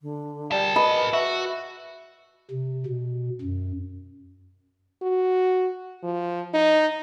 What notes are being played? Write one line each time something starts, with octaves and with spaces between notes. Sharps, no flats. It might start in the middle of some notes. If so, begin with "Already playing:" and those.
D3
G3 A#4 A5
B4 D#5 B5
F#4 E5
C3
B2
F#2
F#4
F3
D#4